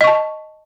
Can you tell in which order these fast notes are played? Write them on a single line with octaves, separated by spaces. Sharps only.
D#5 C#6 A5